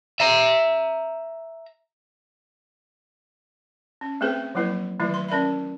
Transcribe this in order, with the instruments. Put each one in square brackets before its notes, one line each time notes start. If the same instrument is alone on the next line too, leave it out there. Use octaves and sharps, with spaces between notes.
[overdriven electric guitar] E5 A#5
[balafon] C#4
A3 B3 C4 G#4 B4 C5
F3 F#3 A#3 E4 B4
D#3 E3 F#3 A3 E4
C6
C#4 A#4 D5 E5 B5